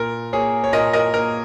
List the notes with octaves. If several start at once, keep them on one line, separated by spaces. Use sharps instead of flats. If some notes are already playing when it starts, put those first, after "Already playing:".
Already playing: A#2 A#4
A#3 G#4 C#5
C#5
A#2 A#4 D#5
A#4 D#5
A#3 A#4